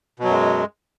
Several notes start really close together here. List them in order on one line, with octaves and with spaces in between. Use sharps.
B2 F#3 F#2 G#3